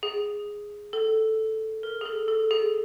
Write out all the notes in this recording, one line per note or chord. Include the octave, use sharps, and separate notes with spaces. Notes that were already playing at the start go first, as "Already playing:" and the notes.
G#4
A4
A#4
G#4
A4
A4
G#4